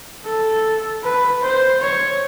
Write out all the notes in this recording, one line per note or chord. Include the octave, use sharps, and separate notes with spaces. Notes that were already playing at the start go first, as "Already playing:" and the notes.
A4
B4
C5
C#5